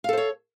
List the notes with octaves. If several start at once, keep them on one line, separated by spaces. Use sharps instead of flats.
A4 C5 C#5 F5